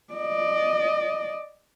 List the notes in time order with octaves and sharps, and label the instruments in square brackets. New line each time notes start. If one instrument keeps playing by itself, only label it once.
[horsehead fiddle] D5 D#5